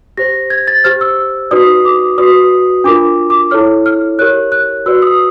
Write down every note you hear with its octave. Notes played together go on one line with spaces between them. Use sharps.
G4 C5 A#6
G#6
A6
G4 C5 F6
E6
D#4 F#4 B4 D5 D#6
D6
F#4 B4 D5 D#6
D4 F4 A#4 D6
D6
E4 A4 C#5 F6
F6
G4 A#4 C#5 F#6
F#6
F#4 B4 D5 E6
D#6